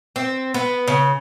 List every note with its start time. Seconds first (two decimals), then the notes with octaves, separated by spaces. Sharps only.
0.16 C4
0.54 B3
0.88 C#3